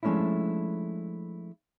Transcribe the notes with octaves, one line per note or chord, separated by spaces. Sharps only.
F3 G#3 A3 C#4 D4 E4